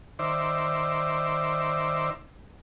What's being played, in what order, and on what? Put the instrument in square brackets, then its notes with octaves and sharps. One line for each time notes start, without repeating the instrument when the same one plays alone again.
[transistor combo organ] D#3 C5 D5 E5